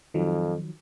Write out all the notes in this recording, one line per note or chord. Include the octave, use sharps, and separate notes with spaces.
F2 D#3 F3 F#3